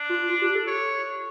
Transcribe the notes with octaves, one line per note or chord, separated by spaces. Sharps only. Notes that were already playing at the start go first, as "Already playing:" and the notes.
Already playing: D4
F4
F4
G4
A4
C#5